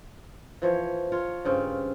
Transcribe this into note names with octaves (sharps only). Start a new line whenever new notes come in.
E3 F3 C#5
F4 C#5
G2 C#3 C4 C#4